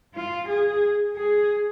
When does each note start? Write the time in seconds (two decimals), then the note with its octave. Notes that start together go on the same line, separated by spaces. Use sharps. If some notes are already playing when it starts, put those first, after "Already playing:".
0.14 F4
0.48 G#4
1.16 G#4